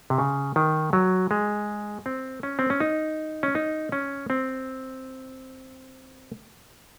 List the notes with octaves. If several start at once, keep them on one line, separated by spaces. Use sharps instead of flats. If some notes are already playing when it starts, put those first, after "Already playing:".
C3
C#3
D#3
F#3
G#3
C4
C#4
C4
C#4
D#4
C#4
D#4
C#4
C4